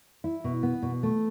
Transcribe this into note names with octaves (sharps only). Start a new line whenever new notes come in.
E4
B2
B3
B2
A3